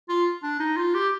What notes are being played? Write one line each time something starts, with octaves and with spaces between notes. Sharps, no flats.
F4
D4
D#4
F4
G4